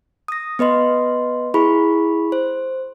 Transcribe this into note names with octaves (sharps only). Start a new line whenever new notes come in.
D#6 A#6
B3 B4 D#5 C6
E4 G#4 B5 C#6
C5